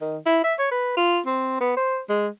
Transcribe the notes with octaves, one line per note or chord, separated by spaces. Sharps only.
D#3
E4
E5
C#5
B4
F4
C4
B3
C5
G#3